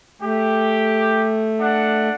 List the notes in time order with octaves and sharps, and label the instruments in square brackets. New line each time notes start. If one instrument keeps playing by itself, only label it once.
[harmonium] A3 [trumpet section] G4
[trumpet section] D4 F#5